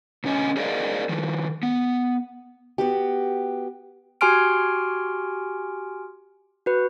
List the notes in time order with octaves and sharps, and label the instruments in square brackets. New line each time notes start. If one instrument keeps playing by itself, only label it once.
[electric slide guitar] B2 D3 C#4 D#5 G#5
G#4 A#4 C5 D5 D#5 F5
D#3 F3
B3
[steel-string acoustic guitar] B3 F#4 G4
[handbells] F#4 G4 G#5 C6 F6 D7
F#4 B4